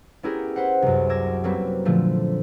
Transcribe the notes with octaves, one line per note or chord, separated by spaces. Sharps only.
B3 C#4 E4 G4 G#4 A#4
B4 C5 F#5
C2 F#2
D6 E6 G#6 A#6
F#3 G3 A#3 C4 F#4 B4
A#2 D3 F3 A3